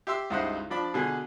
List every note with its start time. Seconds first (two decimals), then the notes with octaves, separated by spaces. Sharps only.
0.07 G4 E5 C6 E6
0.30 C#2 G2 D#4 E4 C5 F#5
0.70 F3 D4 D5 B5
0.94 B2 D3 G#4 G#5